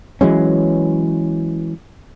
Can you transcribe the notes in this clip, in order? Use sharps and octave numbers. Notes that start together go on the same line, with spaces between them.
E3 F#3 G#3 C#4